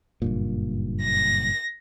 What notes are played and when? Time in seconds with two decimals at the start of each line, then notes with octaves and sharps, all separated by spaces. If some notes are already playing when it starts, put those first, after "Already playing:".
0.22 F#1 G2 A#2
1.02 A#6